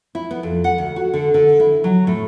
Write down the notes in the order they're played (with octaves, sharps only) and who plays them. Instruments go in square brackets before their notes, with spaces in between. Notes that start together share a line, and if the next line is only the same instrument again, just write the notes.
[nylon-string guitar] E4
B3
F2
F#5
D2
F#4
D3
D3
E4
F#3
A2